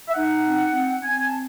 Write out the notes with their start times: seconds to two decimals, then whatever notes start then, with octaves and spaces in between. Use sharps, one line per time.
0.09 E5
0.15 D#4 F#5
0.45 C4
0.74 C4
1.04 C4 G#5
1.23 A5